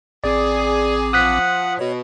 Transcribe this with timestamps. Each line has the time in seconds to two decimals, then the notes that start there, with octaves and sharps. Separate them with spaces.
0.24 A1 C4 G#4 D5 D6
1.13 F3 F#5 D#6 F#6 B6
1.79 B2 C#5